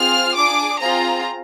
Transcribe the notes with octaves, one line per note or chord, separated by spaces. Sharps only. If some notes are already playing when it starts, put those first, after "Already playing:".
Already playing: C4 F4 G#4 F6
D4 G#4 D6
C4 F4 G#4 A#5